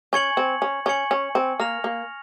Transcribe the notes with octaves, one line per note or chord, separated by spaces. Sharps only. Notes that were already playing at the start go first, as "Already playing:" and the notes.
C#4 G#5 C#6 G#6 C#7 F#7
C4
C#4
C#4 G#5 C#6 G#6 C#7 F#7
C#4
C4
A#3 F6 A#6 F7
A#3